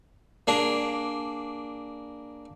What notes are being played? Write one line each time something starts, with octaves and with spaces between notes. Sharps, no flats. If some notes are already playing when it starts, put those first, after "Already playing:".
A#3 D4 G#4